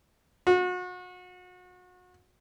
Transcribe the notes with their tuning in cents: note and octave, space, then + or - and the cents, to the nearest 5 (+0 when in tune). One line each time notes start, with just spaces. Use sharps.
F#4 -35